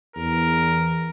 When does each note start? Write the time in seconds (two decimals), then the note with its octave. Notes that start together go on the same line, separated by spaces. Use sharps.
0.16 E2 A#4